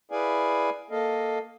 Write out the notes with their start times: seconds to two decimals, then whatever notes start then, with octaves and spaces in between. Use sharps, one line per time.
0.11 E4 G#4 B4 D5 F5 G#5
0.91 A#3 A4 D#5 F5